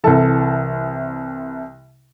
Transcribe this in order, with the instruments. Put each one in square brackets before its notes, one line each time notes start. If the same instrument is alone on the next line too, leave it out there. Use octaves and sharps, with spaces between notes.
[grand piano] C2 C3 E3 A4 A5